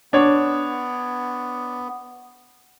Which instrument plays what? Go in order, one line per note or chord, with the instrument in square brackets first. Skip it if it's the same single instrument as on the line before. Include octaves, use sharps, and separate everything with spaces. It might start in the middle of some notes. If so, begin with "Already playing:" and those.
[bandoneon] B3 [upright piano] D4 C#5